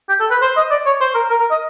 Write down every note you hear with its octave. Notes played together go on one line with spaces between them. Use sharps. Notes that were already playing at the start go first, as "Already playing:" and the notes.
G4
A4
B4
C5
D#5
D5
C#5
C5
A#4
A#4
A#4
D#5